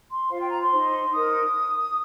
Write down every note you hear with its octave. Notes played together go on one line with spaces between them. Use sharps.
C6
F4 C5 F5
G5
A#5
C6
D#4 C5
D#4 A#4 D#6